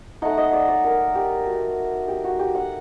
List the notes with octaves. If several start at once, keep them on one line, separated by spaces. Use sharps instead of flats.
A3 D#4 F#5
D#5
D5
D5
A#4
G4
F#4
G4
F#4
G4
F#5